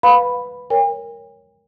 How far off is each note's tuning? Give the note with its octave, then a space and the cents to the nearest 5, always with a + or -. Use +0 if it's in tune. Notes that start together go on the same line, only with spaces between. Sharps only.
B4 +0 F5 +30 B5 +0
A#4 +0 C#5 +0 G5 +45